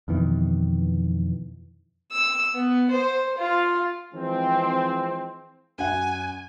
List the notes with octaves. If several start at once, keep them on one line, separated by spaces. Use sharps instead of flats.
F2 B2 D#3 E3
E6
B3
C5
F4
E3 F3 G#3 C4
F#2 F#5 G#5